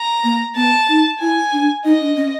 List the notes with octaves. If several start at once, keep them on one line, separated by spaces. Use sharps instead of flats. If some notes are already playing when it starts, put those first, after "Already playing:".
Already playing: A#5
A#3
B3 A5
D#4
E4 G#5
D4
D#4 D#5
D4
C#4